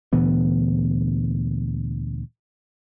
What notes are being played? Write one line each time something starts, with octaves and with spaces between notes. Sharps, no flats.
D2 A#2 E3 B3